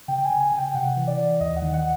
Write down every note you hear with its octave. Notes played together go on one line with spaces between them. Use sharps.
C#3 G5
G5
G#5
C#3
G#5
C#3
G5
C3 F#5
E3
D5
E3
D#2 D#5
F#5
D#3
F#5